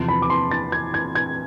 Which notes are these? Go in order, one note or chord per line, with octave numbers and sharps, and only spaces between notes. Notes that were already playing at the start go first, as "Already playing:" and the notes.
Already playing: E2 C3 F3 A5
B5
D6
C6
A6
G#6
G#6
G#6